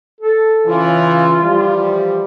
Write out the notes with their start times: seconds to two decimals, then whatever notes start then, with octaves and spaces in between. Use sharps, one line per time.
0.21 A4
0.66 C#3 E3 F4
1.42 E3 F3 G3